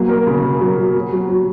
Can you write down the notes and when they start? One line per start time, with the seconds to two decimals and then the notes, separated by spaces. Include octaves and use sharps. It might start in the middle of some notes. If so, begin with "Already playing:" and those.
Already playing: F#3 A#3
0.09 A#4
0.27 C#3
0.43 A#4
0.61 F#3
0.78 F#3
0.95 F#3
1.12 F#3
1.29 F#3